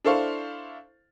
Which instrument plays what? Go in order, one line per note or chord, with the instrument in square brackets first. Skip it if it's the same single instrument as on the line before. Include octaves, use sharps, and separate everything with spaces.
[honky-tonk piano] D4 E4 A4 C5 F5 C#6